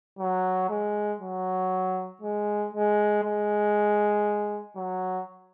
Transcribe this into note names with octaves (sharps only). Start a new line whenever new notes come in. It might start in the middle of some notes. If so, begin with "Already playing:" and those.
F#3
G#3
F#3
G#3
G#3
G#3
F#3